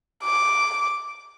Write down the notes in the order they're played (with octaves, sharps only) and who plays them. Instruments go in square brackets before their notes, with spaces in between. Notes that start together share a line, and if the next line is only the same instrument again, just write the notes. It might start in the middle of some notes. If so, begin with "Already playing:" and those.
[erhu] D6